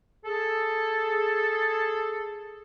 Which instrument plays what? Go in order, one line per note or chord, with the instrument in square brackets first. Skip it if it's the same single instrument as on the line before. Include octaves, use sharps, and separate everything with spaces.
[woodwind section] G#4 A4